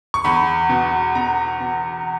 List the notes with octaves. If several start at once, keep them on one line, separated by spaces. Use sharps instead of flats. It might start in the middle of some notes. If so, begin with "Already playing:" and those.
C#6
E2 B5
B2
B2 A#5
B2